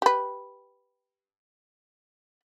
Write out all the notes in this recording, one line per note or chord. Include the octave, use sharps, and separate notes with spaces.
G4 B4